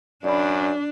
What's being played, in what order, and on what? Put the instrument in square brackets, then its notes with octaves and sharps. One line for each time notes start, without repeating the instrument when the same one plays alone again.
[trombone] F#2 [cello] D4 [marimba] D5 B5